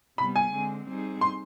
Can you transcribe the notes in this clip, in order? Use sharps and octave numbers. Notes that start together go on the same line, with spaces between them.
C3 G3 B3 B5
G#5
D3 G#3 C4
G3 C4 D#4 G#4
C6